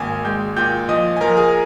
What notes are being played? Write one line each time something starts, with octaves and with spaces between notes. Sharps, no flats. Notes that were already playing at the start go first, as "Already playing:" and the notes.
Already playing: G#1 A#3 G#5 G#6
G#3 G5 G6
A#2 G5 G6
F3 D#5 D#6
G#5
F3 A#4 A#5
G#4 G#5